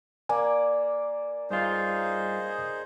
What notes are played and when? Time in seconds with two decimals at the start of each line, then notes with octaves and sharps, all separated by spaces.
0.29 A#3 D5 G#5
1.50 G2 D#4 F4 G#4 C5